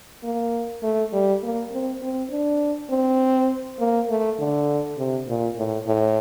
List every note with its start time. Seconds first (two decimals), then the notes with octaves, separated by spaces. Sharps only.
0.24 A#3
0.83 A3
1.13 G3
1.43 A#3
1.73 C4
2.02 C4
2.31 D4
2.90 C4
3.80 A#3
4.09 A3
4.39 D3
4.98 C3
5.28 A#2
5.57 A2
5.87 A2